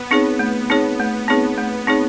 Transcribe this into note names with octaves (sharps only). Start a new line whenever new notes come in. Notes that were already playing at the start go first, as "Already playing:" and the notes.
Already playing: B3
C4 D#4 G#4 C#5
A3
C4 D#4 G#4 C#5
A3
C4 D#4 G#4 C#5
A3
C4 D#4 G#4 C#5